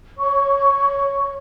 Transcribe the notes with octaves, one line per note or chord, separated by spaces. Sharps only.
C#5 C#6